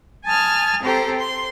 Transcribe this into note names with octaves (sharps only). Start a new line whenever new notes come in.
G#5 A5 D#6 F6
C4 G4 A4 C5 A#5
C5 C6